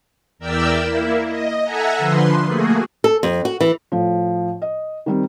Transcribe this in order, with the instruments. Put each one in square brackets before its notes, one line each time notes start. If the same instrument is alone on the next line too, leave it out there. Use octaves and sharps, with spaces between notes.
[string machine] E2 A#4 D5 E5 G5 E6
A#3 E4
D#5
A4 E5 F#5 G#5 A#5
D3 F3 B4 C6
A3 A#3 F#4 G#4
[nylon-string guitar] A4
F2
F#4
E3
[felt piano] A2 F3
D#5
D#3 G3 C4